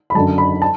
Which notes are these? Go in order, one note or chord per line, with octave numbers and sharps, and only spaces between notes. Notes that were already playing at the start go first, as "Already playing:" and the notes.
B5
F#2 D3 F#3 A5
B5
A5